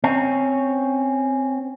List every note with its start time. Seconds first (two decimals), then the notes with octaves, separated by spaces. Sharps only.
0.04 C4 C#4